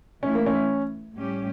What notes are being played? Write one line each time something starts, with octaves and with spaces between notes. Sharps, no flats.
E3 A3 C#4 E4
A#3
C#4
A2 G3 C#4 G4